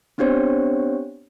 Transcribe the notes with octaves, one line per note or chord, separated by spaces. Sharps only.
B3 C4 D4 G4 C5 C#5